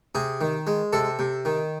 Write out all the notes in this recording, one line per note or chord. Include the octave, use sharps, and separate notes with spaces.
C3 G#4
D#3
G#3
C3 A4
C3
D#3